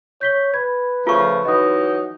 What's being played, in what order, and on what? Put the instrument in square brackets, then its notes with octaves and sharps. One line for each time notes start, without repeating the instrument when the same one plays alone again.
[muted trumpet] C#5 [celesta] G6 B6 G7
[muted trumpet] B4 [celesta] G#6
[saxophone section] C#3 F3 A3 [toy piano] F4 C#6
[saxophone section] E3 F#3 D#4 [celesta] D#5 D#6